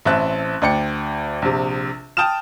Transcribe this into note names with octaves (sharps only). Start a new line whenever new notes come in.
A1 C4 E5 A5 F#6
D2 D5 G5 C#7
A#1 C3
G5 A5 D#6 F6 E7